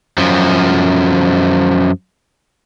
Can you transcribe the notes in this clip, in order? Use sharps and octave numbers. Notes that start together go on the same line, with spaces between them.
F#2 F3